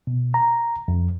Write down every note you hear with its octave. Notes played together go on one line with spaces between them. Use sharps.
B2
A#5
F2